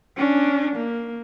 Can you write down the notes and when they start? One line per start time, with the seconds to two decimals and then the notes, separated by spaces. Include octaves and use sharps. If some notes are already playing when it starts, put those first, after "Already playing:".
0.17 C#4 D4
0.76 A#3